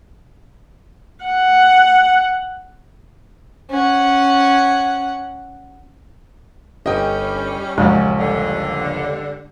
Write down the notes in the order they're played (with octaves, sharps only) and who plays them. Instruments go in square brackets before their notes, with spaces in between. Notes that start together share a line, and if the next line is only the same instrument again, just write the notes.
[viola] F#5
[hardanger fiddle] C#4 F#5
[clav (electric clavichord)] G1 [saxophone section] G3 C#4 [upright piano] D#5 G5
[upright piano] A#1 [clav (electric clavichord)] D#2 C#3 [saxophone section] F#3 [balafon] G#3
[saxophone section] G2 D3